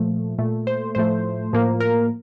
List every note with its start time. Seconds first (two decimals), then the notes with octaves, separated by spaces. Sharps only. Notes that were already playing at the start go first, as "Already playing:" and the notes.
Already playing: A#2 F3 A3
0.38 A#2 A3
0.67 C5
0.95 A2 F3 A3 C5
1.53 A2 F3 A#3
1.80 A#4